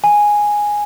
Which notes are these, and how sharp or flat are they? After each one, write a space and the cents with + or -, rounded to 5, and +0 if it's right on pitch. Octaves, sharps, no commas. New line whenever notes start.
G#5 -5